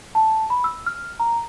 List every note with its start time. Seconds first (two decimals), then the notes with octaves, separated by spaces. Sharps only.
0.15 A5
0.50 B5
0.64 E6
0.86 F6
1.20 A#5